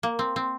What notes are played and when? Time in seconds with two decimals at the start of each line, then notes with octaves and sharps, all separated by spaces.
0.03 A#3
0.19 C4
0.36 C4